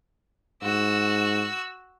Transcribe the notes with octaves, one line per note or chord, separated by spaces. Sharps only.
G#2 F#4 E6